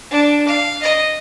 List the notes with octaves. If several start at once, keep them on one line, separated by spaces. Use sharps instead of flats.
D4
F5
D#5